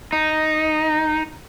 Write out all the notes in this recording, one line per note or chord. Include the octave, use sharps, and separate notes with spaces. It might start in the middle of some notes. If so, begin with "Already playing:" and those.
D#4